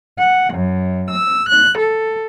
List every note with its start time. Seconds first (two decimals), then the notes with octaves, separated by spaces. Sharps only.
0.19 F#5
0.53 F#2
1.10 E6
1.49 F#6
1.78 A4